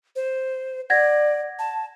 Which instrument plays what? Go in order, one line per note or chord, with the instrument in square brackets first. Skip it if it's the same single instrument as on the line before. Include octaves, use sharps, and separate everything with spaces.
[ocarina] C5
[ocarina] D5 [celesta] F#5 G#6 A#6
[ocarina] A5